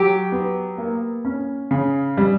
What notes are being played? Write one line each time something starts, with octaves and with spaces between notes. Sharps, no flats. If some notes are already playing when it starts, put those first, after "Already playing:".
Already playing: F#3 G4
B3
A#3
C#4
C#3
G3